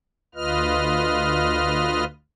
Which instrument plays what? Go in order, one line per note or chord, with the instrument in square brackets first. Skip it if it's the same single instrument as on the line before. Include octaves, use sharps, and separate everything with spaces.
[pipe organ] D2 F4 B4 D#5 F6